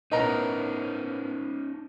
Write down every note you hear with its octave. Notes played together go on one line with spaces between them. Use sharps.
A2 B3 C#4 D#4 A#4 D#5 A#5